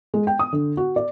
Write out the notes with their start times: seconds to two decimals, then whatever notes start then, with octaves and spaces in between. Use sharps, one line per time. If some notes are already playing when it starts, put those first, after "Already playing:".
0.14 G#3
0.27 G5
0.39 D#6
0.53 D3
0.77 F#4
0.96 D5